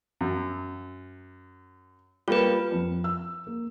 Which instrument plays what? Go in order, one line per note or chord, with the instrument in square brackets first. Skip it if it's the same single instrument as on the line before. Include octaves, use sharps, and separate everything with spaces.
[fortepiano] F#2
[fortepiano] G3 A#3 [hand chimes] F4 B4
[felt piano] F2
E6
A#3